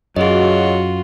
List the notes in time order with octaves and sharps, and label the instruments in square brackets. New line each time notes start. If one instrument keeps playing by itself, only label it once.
[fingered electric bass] F#2 [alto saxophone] F#3 [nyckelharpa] F4 F#4 [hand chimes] G#4 D#5